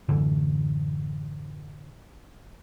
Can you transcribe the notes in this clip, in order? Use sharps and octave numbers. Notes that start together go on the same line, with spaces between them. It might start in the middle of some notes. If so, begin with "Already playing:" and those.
F#2 A2 D3 E3